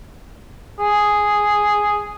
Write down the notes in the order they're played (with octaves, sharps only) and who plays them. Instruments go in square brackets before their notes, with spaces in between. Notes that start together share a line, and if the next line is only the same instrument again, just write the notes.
[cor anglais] G#4